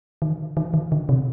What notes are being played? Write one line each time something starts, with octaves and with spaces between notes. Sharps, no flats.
D#3
D#3
D#3
D3
C3